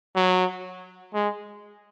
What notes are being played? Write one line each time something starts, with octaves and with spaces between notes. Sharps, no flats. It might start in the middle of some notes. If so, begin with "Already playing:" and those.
F#3
G#3